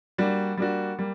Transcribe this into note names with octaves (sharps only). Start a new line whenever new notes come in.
G3 A#3 D4 F#4
G3 A#3 D4 F#4
G3 A#3